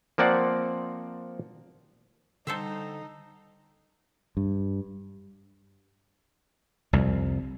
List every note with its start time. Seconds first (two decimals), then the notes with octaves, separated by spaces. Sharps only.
0.18 F3 A#3 C4 D5 F#5
2.47 D3 G3 D#4 A4 C5 E5 A5
4.37 G2
6.93 C2 F2